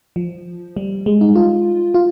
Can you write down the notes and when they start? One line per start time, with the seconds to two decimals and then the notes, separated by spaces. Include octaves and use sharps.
0.16 F3
0.76 G3
1.06 G#3
1.21 D#4
1.36 F4
1.94 F4